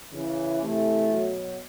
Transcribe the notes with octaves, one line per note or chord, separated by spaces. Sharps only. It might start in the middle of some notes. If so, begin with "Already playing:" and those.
C#3 E3
C3 E3 A3
B2 F#3